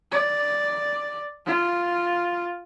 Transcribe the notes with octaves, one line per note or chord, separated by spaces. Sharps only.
D5
F4